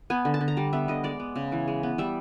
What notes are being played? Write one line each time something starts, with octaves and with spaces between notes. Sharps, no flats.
B3 G#5
D3
A5
D3
A#5
G3 A5
B3 E5
D3 D#5
G#3 D5
B3
C#3
E3
G#3
B3
G3 E5